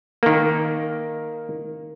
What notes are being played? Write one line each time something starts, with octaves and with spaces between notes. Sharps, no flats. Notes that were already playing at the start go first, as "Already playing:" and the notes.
D#3 A#3